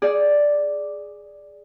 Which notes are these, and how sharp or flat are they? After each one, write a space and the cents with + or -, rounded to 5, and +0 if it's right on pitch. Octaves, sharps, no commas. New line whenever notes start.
G#4 +0 D5 +0